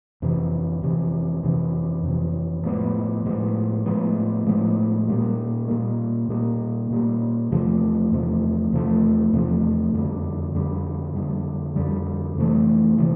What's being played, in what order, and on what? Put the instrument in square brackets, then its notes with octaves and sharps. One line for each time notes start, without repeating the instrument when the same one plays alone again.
[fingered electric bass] F2 C3 E3
F2 C3 E3
F2 C3 E3
F2 C3 E3
A2 F3 G#3 B3
A2 F3 G#3 B3
A2 F3 G#3 B3
A2 F3 G#3 B3
A#2 G3 A#3
A#2 G3 A#3
A#2 G3 A#3
A#2 G3 A#3
E2 C3 F3 A3
E2 C3 F3 A3
E2 C3 F3 A3
E2 C3 F3 A3
F2 D3 G3
F2 D3 G3
F2 D3 G3
F2 D3 G3
F2 C3 E3 A3
C3 E3 A3